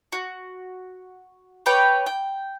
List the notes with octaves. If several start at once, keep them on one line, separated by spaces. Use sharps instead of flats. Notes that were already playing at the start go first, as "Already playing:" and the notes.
F#4
G4 B4 C#5 G5
G5